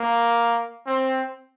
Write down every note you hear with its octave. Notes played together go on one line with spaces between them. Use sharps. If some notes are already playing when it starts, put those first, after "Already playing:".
Already playing: A#3
C4